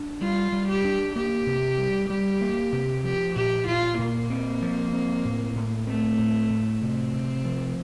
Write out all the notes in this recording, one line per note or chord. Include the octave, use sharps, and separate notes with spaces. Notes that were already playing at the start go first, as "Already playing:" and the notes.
Already playing: D4
G3 F4
G3
G4
D4
A#3 G4
C3
G3
G3 G4
A#3
C3
F3 G4
A#2 G4
A#2 F4
A#2 A#3
C4
F3
C4
A2
A2
A3 C4
A2
A2
C3 C4
C3
F3